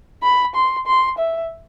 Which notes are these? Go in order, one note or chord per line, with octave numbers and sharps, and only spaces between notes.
B5
C6
C6
E5